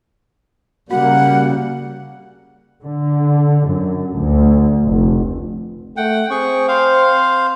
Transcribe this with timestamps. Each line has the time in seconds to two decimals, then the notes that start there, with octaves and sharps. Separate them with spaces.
0.91 C#3 G3 A#3 F#4 F#5
2.83 D3
3.69 F#2
4.18 D2
4.85 F1
5.97 A3 F#5 G5
6.31 C4 G#4 G5 C#6
6.68 C5 F5